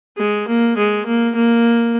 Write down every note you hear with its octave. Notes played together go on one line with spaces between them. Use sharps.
G#3
A#3
G#3
A#3
A#3